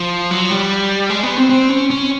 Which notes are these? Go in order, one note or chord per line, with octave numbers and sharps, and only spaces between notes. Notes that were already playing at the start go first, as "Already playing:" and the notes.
Already playing: F3
F#3
G3
G#3
B3
C4
C4
C#4
C#4